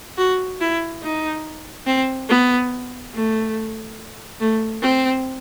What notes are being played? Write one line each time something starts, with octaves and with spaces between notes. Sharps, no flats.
F#4
E4
D#4
C4
B3
A3
A3
C4